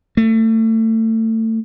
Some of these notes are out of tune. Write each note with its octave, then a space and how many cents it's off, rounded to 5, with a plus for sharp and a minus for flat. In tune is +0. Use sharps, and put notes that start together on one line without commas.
A3 +30